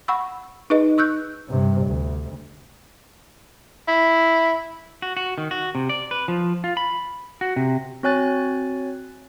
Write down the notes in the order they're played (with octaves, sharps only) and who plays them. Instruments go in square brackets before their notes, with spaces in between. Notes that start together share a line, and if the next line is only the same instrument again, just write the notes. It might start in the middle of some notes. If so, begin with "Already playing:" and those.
[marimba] F#5 B5 C#6 E6
D#4 G#4 B4 D#5
C#6 E6 F#6 G6
[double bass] G2 C3
D2
[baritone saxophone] E4
[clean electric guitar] F#4
F#4
D#3
F#4
C3
D5
B4
F3
F4
B5
F#4
C3
[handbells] C4 F#4 C#5 G#5 F#6 A6